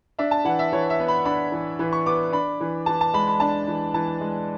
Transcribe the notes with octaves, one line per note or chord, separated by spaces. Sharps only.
D4 E5
A5
E3 F#5
E5
E3 C#5
E5
B3
B5
D4 B5
E3
E3
C#6
B3 D6
D4 B5
E3
E3 A5
A5
G#3 B5
B5
D4 A5
E3
E3 A5
G#3